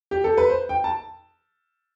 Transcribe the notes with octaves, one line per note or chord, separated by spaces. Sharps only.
G4
A4
B4
C5
G5
A5